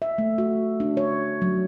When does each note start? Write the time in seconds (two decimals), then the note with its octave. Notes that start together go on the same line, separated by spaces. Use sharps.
0.02 E5
0.18 A3
0.38 F#4
0.80 D4
0.97 C#5
1.42 F#3